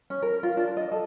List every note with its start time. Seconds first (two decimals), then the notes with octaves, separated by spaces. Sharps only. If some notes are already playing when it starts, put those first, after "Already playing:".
0.10 C#4
0.22 A#4
0.43 F4
0.57 D4
0.77 D#5
0.92 A4